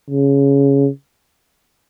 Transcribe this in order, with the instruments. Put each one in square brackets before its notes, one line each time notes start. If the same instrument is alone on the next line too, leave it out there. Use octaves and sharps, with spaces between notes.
[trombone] C#3